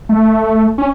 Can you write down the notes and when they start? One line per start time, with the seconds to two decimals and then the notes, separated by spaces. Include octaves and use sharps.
0.09 A3
0.78 C#4